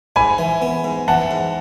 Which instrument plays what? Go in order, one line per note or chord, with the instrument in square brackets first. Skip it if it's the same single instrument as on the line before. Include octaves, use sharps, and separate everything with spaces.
[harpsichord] G#2 [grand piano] G#5 B5
[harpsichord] E3
B3
G#2
[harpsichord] E3 [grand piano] F#5 A5
[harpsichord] G#2